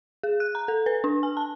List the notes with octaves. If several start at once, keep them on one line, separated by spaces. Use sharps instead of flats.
G#4
F#6
A#5
A4
B4
D4
G#5
A5